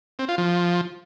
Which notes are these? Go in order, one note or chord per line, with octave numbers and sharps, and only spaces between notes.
C4
F4
F3